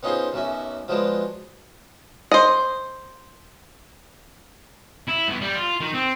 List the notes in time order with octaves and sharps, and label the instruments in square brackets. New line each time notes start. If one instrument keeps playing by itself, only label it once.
[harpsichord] B3 C#4 D#4 F4 G#4 C5
B1 F#2 C#4 E5
F3 F#3 G#3 B3 D4
[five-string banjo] C5 D#5
[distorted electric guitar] E4
G2 B3
G3
F4
D#3
C4